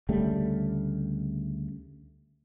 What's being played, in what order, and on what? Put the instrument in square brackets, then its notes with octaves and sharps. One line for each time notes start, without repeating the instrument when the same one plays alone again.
[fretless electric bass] D2 C#3 G3 A3